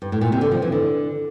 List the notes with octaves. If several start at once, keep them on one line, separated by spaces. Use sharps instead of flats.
G2
A2
A#2
C3
D3
F3
E3
D3